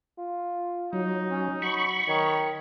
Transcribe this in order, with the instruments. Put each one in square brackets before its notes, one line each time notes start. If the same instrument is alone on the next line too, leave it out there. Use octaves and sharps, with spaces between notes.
[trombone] F4
[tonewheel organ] F#3 [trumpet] D#4
[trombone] C#4
[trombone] F#3 [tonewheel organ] B5 C#6
[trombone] D#3 [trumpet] C#5